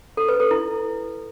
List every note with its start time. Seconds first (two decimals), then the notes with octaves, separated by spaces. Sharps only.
0.17 A4
0.29 B4
0.40 A4
0.51 E4